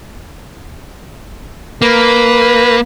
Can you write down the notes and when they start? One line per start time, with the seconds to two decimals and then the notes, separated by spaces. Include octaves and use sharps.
1.82 A#3 B4